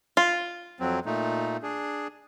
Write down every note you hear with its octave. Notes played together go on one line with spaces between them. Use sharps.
F4
F2 F#3 C4
A#2 A3 D#4
D4 G#4